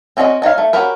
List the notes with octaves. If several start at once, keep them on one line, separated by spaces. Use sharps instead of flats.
C4 C#4 F#4 B4 D#5
D4 D#4 C#5 F5
A3
C#4 F#4 G4 A#4 B4